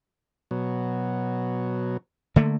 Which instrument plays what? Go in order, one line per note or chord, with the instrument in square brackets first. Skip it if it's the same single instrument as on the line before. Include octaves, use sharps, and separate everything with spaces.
[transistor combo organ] B2 F#3
[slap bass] D3 A3 A#3